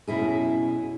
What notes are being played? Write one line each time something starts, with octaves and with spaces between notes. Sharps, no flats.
F#2 B2 E4 G#4